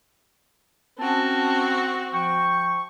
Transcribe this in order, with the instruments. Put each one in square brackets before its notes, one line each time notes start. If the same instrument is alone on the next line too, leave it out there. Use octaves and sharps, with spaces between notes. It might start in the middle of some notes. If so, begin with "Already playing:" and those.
[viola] C4 F#4 [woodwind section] C#4 A5
[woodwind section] F3 G5 C#6